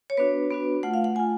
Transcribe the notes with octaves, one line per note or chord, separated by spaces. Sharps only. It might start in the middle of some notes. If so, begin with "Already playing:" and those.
C#5
B3 D4 F#4 B4
B3 D4 F#4
A3 F4 F#5
F5
F#5
A3 F4 G#5